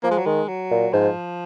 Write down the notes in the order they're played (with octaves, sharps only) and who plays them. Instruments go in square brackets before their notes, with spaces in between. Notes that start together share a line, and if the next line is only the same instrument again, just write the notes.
[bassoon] F3 [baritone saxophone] A#3
[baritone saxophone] G#3
F#3
[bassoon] D#3 [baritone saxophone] G#3
[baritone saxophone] F#3
[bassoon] A#2
[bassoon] G#2 [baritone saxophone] F3